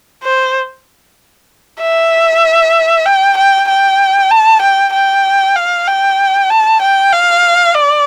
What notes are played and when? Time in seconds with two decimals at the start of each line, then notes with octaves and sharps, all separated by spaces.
0.23 C5
1.81 E5
3.06 G5
3.37 G5
3.68 G5
4.30 A5
4.62 G5
4.93 G5
5.56 F5
5.87 G5
6.50 A5
6.82 G5
7.12 F5
7.74 D5